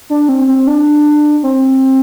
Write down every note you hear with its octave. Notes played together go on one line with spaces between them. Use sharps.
D4
C4
C4
D4
C4